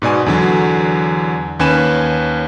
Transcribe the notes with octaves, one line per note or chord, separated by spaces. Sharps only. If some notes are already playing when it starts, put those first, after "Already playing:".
G#2 B2 D5 G#5
E2 D3 F#3
D#2 C#4 B4 G#5 B5 E7